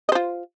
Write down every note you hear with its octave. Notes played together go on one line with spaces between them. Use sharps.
F4 C5 D#5